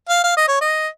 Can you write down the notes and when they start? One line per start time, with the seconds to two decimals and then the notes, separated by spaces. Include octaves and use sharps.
0.09 F5
0.24 F5
0.37 D#5
0.48 C#5
0.61 D#5